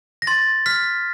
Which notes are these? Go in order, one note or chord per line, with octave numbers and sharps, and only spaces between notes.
A#6
C6 A6
F6 B6